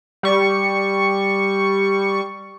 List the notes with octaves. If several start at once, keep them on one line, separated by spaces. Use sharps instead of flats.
G3 C#6